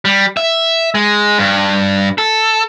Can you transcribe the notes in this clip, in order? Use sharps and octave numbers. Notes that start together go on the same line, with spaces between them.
G3
E5
G#3
G2
A4